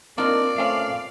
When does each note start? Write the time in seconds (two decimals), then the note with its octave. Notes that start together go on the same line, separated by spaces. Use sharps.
0.18 A#3 C4 D4 D#4 F4 A#4 D5
0.58 A3 C4 C#4 F5